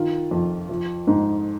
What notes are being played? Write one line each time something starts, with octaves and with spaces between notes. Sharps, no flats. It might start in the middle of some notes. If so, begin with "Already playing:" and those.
Already playing: D#3 F4
F2
F3
G#2